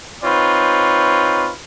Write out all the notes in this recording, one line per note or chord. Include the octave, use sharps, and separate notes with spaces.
C4 D#4 F4 B4 C#5